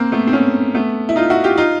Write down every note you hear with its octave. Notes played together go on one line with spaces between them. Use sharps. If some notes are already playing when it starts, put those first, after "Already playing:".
Already playing: A#3 C4
A3 B3
C4
B3 C#4
A3 B3
E4
D#4 F4
E4 F#4
F4 G4
D#4 F4